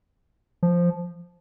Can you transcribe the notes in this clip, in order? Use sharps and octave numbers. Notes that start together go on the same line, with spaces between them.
F3